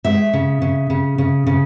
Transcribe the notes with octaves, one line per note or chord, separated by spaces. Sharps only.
G#3 E5
C#3
C#3
C#3
C#3
C#3